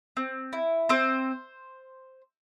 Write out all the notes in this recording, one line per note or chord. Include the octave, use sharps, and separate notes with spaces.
C4
E4
C4 C5